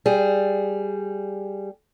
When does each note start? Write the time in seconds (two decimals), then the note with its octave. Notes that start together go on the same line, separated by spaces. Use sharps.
0.06 G3 G#4